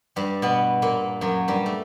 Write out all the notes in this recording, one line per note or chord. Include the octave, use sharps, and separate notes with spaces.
G2 G3
B2 B3
A#2 A#3
F#2 F#3
G2 G3
A3